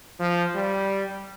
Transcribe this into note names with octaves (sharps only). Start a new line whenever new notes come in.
F3
G3